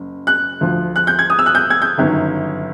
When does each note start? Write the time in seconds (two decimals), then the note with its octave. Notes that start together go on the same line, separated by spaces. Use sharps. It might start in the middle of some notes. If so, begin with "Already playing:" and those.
Already playing: F#1 F#3
0.27 F#6
0.61 D2 D3 F3
0.96 F#6
1.07 G6
1.19 G#6
1.30 D#6
1.39 E6
1.46 F#6
1.55 G6
1.70 G#6
1.82 G6
1.98 G1 F#2 D#3 F#3